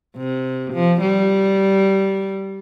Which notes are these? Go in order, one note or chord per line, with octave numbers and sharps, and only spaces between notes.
C3
F3
G3